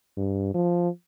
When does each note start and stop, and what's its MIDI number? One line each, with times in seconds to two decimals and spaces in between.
0.17 0.54 43
0.54 0.89 53